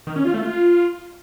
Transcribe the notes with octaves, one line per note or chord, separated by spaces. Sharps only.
D#3
C#4
F4
A3
F4